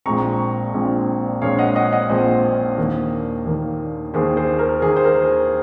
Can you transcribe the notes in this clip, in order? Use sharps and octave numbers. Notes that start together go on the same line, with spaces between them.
A#1 A#2 G#3 C4 A#5 C#6
A#1 A#2 G#3 C4
A#1 A#2 G#3 C4 C#5 F5
D#5 F#5
D#5 F#5
D#5 F#5
A#1 A#2 G#3 C4 C5 D#5
D#2 D#3 A#3
D#2 D#3 A#3
D#2 D#3 A#3 G#4 C5
G#4 C5
A#4
D#2 D#3 A#3 G#4
C5
A#4